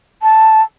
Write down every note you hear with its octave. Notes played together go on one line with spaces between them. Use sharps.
A5